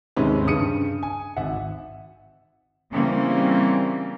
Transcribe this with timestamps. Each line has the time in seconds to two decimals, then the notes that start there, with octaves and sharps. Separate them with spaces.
0.16 D#2 G#2 C3 G#3 C#4 B4
0.46 G2 C#3 D#6 C#7 D#7
1.03 G#5
1.37 G#1 E5 F#5
2.92 C#3 E3 G3 A#3 C4 C#4